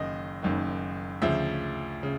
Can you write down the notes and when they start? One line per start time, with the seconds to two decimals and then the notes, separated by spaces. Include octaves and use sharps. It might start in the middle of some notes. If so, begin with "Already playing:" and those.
Already playing: F#1 F#2 D#3 D#5
0.43 F#1 F#2 D#3
1.22 D2 C#3 F3 E5
2.03 C#3